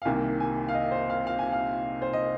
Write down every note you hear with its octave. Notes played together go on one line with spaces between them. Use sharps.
F5
C2 C3 D#3 A#3 G#5
G#5
F5
D#5
C5
F5
F5
G#5
F5
C5
D#5